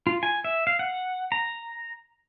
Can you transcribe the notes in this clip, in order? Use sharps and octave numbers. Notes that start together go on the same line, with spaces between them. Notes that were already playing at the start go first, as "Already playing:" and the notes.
F4
G#5
E5
F5
F#5
A#5